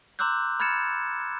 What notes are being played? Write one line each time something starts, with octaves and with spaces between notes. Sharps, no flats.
A#5 C6 D6 E6 F#6 G6
B5 F6 G#6 A6 C#7 E7